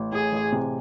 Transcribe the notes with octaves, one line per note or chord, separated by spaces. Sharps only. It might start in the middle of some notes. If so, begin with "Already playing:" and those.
Already playing: A1
A2 G#4
A1
C3